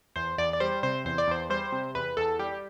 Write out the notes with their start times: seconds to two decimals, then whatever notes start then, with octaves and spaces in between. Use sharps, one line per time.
0.16 E2 C5
0.38 E2 D5
0.53 D5
0.60 G3 C5
0.83 C3 C5
1.05 E2 C5
1.18 D5
1.28 E2 C5
1.50 G3 C5
1.72 C3
1.95 E2 B4
2.17 E2 A4
2.39 G3 G4